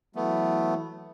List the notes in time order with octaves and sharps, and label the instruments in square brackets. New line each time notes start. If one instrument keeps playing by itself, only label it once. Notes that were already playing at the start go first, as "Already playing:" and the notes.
[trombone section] E3 F#3 [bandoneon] A3 B3